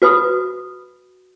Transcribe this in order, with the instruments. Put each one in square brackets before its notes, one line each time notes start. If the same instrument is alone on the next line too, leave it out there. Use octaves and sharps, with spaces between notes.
[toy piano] F#4 B4 B5 D#6